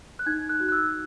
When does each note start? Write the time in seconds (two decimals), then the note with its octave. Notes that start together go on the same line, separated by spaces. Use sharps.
0.19 F#6
0.26 D#4 G#6
0.49 F#6
0.60 F#4
0.69 F#6
0.72 E6